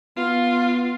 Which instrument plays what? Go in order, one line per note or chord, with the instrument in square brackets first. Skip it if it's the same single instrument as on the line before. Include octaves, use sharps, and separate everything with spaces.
[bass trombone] B3 [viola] F4